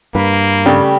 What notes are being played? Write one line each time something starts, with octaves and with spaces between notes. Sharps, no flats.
G2 A#3 B4
C#3 G3 A3